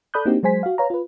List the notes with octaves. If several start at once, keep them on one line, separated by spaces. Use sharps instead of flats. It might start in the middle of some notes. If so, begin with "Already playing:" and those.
A4 D5 B5 D#6 F#6 G6
A#3 C4 D4 D#4 F#4 G4
F#3 G#3 C5 G#5 B6
F#4 F5
B4 C#5 F5 A#5
F4 B4